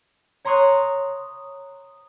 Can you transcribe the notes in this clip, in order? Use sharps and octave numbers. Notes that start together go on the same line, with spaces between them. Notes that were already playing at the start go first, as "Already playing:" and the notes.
C#5 A#5 C6 C#6 D#6 F#6